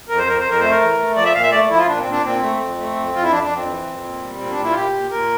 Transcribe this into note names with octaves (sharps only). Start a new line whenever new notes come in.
F2 A#4
C5
F2 A#4
C5
F2
A#4
A3 C5
A#4
E3
A3
F3 D5
E5
A#2 F5
E5
A3 D5
F3 E4
F4
A#2 D4
C4
A#2
D4
A#2 C4
A3
F2
A3
F2
F2 F4
E4
F2 D4
D4
F2
C4
E3
F2
A#2
G3
A#2 C4
D4
A#2
E4
F4
A#2 G4
A#2
A#2 A#4